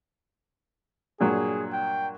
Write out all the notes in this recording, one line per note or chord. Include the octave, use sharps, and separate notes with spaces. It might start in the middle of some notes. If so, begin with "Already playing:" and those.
G2 A#2 F#3 G#4
G5